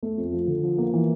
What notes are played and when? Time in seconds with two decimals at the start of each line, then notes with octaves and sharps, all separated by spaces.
0.03 A3
0.18 F2
0.33 F3
0.48 D3
0.63 F3
0.78 A#3
0.94 E3